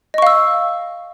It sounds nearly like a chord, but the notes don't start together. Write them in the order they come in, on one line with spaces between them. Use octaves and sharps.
D#5 C#6 F5 E6